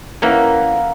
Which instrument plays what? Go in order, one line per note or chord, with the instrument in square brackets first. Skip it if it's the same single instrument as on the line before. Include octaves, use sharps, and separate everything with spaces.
[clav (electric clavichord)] E3 A#3 C#4 [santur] A#4 F5 F#5